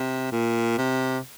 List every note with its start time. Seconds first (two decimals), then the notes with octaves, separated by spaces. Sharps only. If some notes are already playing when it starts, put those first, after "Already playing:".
Already playing: C3
0.32 A#2
0.78 C3